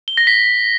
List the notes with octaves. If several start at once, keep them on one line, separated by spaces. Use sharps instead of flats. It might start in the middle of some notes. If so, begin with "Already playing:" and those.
G7
A#6
B6